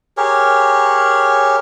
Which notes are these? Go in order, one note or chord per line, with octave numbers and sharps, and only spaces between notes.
G4 G#4 A#4 C#5